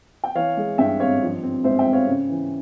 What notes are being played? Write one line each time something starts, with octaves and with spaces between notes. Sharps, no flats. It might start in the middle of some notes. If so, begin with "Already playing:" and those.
G5
E3 C#5 F5
G#3
G2 E5 G5
G#1 C#5 F5
F3
C4
G#2 C5 E5
E5 G5
G#1
C#5 F5
C#3
E3